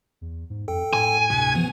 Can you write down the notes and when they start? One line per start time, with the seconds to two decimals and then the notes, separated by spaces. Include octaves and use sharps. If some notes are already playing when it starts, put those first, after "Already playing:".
0.21 E2
0.50 G#2
0.68 F2 A4 G5
0.93 A2 G#5
1.30 D2 G2 C3
1.55 E3 F3 B3